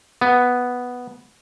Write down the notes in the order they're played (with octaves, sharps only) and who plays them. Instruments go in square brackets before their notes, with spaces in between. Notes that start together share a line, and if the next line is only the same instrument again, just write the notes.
[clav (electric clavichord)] B3